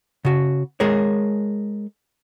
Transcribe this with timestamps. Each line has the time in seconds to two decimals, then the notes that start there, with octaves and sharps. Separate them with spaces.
0.25 C#3 F#4
0.80 G#3 G#4 A#4 C#5